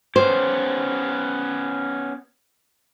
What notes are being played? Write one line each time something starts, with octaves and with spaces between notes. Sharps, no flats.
B3 C#4 G4 C5